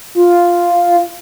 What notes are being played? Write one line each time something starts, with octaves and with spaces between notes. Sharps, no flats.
F4